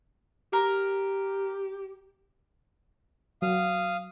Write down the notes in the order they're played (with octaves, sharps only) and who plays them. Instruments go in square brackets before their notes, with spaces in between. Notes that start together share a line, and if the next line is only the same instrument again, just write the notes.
[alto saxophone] G4 [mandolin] A#4
[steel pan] F#3 [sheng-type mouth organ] F5 D#6